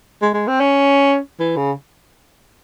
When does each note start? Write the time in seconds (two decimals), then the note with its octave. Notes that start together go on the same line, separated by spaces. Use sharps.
0.22 G#3
0.34 G#3
0.47 C4
0.60 C#4
1.40 E3
1.56 C#3